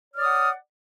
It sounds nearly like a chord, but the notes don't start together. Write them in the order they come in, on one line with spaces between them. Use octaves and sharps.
C#5 F6 D5 D#6 F#5